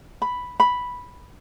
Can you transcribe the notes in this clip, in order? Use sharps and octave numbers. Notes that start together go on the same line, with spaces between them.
B5
B5